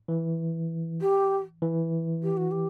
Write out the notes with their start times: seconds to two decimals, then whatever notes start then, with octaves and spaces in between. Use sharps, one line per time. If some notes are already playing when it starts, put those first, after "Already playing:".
0.08 E3
1.01 G4
1.62 E3
2.23 G4
2.37 F#4
2.51 G4